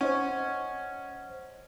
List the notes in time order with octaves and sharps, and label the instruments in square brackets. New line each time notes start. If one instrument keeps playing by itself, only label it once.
[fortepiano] C#4 [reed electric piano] C5 D#5 F#5